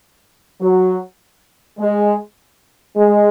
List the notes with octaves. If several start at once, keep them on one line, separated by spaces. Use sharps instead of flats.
F#3
G#3
G#3